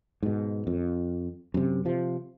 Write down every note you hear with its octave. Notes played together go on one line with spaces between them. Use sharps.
G#2 B2
F2
F#2 C3
C3 F3